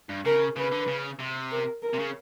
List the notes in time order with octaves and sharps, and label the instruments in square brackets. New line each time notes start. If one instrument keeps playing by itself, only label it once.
[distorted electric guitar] G2
[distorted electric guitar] C#3 [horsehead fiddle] A#4
[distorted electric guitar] C#3 [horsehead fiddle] B4
[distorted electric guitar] D3
C#3
C3
[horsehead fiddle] A#4
A#4
[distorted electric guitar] C3
C#3